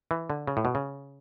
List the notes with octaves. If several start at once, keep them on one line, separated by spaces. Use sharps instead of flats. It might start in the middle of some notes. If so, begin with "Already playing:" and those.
E3
D3
C#3
A2
B2
C#3